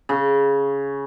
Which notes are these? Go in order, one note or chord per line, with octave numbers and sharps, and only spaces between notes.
C#3